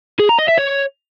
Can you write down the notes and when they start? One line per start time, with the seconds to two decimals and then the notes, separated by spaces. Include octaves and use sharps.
0.20 G#4
0.29 A#5
0.39 D#5
0.49 E5
0.58 C#5